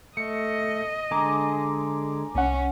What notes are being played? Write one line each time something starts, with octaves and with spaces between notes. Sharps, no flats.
A3 D#5 C#7
D3 G#3 G#4 G#5 A#5 D6
C2 C#4 F#5